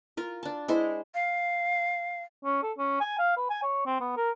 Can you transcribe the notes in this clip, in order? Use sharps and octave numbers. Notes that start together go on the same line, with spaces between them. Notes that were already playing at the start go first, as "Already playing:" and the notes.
F4 A#4
D4 A5
G#3 E4 C5
F5
C#4
A4
C#4
G#5
F5
B4
G#5
C#5
C4
B3
A#4